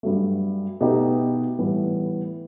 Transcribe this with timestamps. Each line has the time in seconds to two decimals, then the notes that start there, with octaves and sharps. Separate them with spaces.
0.03 G2 F#3 A3
0.81 B2 A3 D#4 G4 B4
1.59 A2 E3 G3 B3 E4